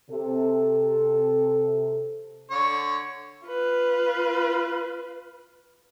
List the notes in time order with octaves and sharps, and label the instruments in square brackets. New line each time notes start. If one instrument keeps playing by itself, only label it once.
[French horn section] C3 A4
[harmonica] D3 C#5
[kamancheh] F4 B4